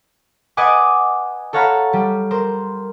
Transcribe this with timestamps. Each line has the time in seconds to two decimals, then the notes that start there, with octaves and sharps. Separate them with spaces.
0.57 B4 D5 D#5 F#5 G#5 D6
1.53 A4 C#5 F5 F#5 A#5 B5
1.93 G3
2.31 A#4 C5